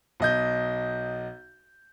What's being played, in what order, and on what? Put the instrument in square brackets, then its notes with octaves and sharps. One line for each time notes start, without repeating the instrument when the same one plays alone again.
[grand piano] B1 D#5 G6